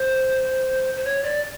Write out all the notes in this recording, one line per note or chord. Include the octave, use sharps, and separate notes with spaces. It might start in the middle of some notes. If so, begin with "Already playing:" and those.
Already playing: C5
C5
C#5
D5